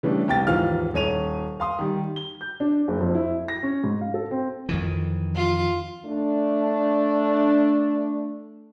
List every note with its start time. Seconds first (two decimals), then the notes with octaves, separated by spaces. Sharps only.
0.03 C#3 E3 G3 A3 D4
0.28 C2 G5 A6
0.47 D#2 G#2 E3 F3 F5 F6
0.94 D#1 C#5 D#7 F7
1.60 F5 C6 D#6
1.79 D#3 G3
2.16 G7
2.41 G6
2.60 D4
2.88 F#1
3.00 F2
3.15 E4
3.48 A#6
3.63 C#4
3.84 G#2
4.01 F5
4.14 A4
4.31 C4
4.69 F2 D#3 E3
5.36 F4
6.06 A3 D4